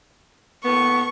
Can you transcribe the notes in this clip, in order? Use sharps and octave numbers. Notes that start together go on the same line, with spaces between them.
A2 A#3 B3 C#6